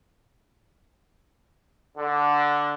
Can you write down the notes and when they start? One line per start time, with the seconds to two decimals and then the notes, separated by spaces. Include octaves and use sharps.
1.98 D3